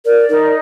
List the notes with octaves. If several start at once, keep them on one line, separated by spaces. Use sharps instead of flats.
A#4 D5
D#4 A#4